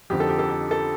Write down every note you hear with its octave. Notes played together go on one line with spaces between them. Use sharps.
F2 D3 F3 C4 D#4 G4
A4
G4
A4
G4
A4